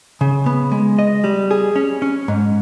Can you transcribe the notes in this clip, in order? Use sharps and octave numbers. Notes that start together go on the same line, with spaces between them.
C#3
B3
G#3
D#5
G3
G#4
C#4
C#4
G#2